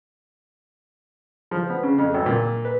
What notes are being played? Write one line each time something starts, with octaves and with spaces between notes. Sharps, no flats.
F3
B3
C#3
F2
G#1
A#2
B4